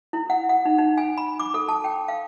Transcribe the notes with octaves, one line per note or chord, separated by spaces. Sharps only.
E4
F#5
F#5
D#4
D#4
G#5
B5
D6
A4
A5
G5
F5